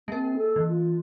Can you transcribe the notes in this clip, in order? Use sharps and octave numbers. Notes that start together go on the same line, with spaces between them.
A#3 C4 A#4
A4
E3
F4